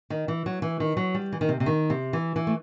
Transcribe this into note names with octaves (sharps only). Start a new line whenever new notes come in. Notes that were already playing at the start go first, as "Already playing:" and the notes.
D#3
E3
F#3
E3
D#3
F#3
G3
E3
D#3
C3
C3
D#3
C3
E3
E3
A3